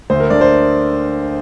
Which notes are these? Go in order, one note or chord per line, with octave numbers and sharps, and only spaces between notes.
D2 C5
A#4
D3 D5
C5